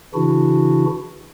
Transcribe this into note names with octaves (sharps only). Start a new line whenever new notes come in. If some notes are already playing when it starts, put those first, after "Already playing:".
C#3 E3 D4 E4 F#4